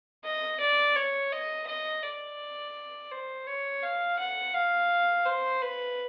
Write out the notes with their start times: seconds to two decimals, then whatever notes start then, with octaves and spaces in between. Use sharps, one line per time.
0.24 D#5
0.60 D5
0.96 C#5
1.32 D#5
1.67 D#5
2.03 D5
3.11 C5
3.47 C#5
3.82 F5
4.19 F#5
4.54 F5
5.26 C5
5.62 B4